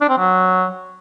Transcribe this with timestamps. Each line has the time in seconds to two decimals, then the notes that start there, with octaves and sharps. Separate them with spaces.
0.01 D4
0.09 C4
0.18 F#3